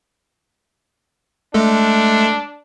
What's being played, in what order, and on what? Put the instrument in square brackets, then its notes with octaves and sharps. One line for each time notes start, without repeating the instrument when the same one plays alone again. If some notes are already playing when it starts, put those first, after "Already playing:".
[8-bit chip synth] G#3 A3 A4 [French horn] D4